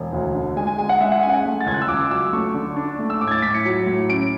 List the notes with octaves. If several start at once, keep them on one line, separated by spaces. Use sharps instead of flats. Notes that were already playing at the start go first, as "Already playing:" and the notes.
Already playing: E1
D2
D3
G#3 G#5
G#5
G#3 G#5
F#5
G#3 E5
F#5
C#4 G#5
F#5
G#5
A3
A6
C#2 G#6
F#6
E6
C#2 D6
F#3 E6
A3 C#6
D3
D4
A3
E6
A2 D6
G#6
A6
A2 B6
C#7
F#3
A2
C#4 D7